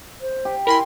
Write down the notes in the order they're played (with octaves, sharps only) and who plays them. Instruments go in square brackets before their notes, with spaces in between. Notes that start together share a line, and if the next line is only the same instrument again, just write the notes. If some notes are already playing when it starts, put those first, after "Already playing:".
[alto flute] C5
[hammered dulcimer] G4
[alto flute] E4 [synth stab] A#4 G#5 C6 [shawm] B5